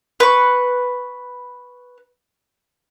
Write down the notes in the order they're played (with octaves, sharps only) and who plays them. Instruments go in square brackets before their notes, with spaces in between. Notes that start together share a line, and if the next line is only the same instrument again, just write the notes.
[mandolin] B4 C#6